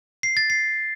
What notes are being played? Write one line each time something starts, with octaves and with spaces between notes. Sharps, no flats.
C7
A6
C7